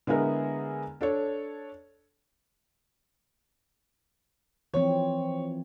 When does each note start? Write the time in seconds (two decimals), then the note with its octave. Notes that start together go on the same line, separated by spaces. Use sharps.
0.07 D3 G#3 B3 E4 G#4 A#4
1.01 D4 A4 C#5
4.74 E3 F3 C4 C#5